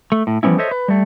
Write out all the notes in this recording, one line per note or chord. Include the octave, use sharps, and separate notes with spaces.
A3
A2
E3 F3 G3 B3 C#4 E4
A4 C5 C#5 D#5 E5
B4
G3 A3